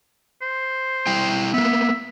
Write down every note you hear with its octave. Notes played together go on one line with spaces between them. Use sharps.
C5
G3 E4 G5
A#3 B3 E5